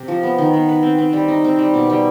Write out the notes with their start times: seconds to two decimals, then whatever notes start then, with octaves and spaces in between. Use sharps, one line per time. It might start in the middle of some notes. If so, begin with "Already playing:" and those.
Already playing: C3
0.08 F3
0.23 B3
0.38 D#3
0.53 B3
0.69 B4
0.83 C4
0.98 C4
1.13 G3
1.28 D#4
1.44 C4
1.59 G3
1.74 B2
1.90 G3